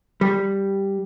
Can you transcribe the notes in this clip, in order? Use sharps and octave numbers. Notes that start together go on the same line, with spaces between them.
G3